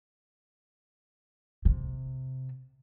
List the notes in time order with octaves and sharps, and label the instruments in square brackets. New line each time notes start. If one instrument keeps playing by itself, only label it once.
[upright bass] C3